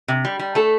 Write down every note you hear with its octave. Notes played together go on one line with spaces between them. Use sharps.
C3
G3
G3
A3 A4